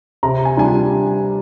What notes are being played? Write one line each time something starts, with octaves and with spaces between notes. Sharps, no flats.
C3 A#5
G#5
G3 D4 F4 G#5